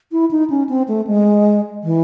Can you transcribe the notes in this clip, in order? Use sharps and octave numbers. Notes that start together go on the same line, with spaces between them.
E4
D#4
C#4
C4
A3
G#3
E3